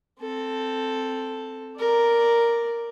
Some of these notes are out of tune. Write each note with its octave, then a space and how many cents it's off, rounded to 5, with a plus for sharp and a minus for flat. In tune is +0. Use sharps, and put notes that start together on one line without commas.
C4 +0 A4 +0
A#4 +0 D5 +0